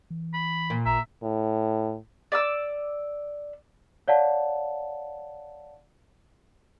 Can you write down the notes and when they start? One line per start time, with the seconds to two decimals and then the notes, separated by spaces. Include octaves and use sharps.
0.10 E3
0.34 B5
0.70 A#2
0.86 A1 E5 A#5
1.23 A2
2.32 D5 D6 E6
4.08 C#5 D5 F5 F#5 A5